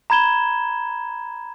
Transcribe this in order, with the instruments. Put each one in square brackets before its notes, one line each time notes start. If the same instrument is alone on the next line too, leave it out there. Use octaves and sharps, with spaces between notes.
[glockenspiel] A#5 B5 G#6 E7 G7